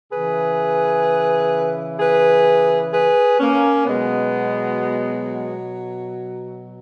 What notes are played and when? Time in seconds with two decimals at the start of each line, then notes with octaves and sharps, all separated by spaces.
0.11 C#3 E3 G#4 B4
1.99 G#4 B4
2.93 G#4 B4
3.40 A#3 C#4
3.87 B2 F#3 G#3 B3